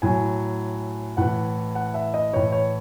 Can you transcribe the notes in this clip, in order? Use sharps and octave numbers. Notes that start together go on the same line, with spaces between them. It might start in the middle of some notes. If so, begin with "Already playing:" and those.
A2 F#3 G#5
A2 E3 F#5
F#5
E5
D#5
A2 E3 C#5
C#5